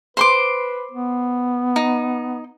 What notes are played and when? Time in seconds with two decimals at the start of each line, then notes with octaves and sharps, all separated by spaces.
0.17 B4 C5 C6 D6
0.92 B3
1.76 D#4